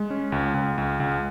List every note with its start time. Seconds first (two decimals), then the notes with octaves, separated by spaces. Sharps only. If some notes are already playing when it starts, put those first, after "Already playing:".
Already playing: G#3
0.10 C#4
0.32 C#2
0.54 C#2
0.78 C#2
1.00 C#2